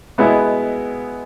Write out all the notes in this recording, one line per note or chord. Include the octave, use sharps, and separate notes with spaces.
B2 G#3 B3 E4